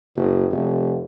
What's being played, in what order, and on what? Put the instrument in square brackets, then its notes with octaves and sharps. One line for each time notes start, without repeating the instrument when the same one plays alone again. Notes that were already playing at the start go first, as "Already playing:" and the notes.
[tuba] F#1
F1